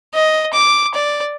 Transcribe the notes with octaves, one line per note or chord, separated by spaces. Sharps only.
D#5
D6
D5